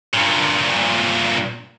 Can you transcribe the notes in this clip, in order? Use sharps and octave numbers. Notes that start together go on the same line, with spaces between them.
G2 A#2